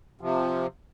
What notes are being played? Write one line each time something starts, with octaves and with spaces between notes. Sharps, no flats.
C3 F3